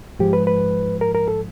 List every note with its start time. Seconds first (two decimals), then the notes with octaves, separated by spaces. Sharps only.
0.19 G#2 F3 G#3 G4
0.33 B4
0.47 B4
1.01 A#4
1.14 A#4
1.28 A4